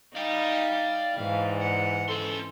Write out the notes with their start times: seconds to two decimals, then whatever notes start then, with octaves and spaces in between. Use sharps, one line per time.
0.16 D#4 D5 F5 G5
1.17 G#2 E3 F5
1.61 F#5
2.09 C#4 A4 C6